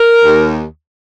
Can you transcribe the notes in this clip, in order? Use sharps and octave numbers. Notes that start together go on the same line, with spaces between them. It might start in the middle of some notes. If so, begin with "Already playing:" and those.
Already playing: A#4
D#2